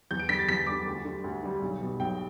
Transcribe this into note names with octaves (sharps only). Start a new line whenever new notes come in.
E2 G6
D7
D3 G3 B6
A6
E2 B6
D3 G3 D6
D2
D3 G3
D2
D3 G3
B1
B2 G3
B1 G5